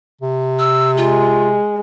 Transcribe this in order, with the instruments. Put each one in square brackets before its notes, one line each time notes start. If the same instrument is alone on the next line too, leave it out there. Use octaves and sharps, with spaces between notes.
[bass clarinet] C3
[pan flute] E6
[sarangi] G#3 [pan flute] F4